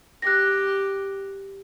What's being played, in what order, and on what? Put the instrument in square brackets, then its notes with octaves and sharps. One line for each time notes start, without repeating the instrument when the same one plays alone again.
[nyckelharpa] G4 [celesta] F#6 A#6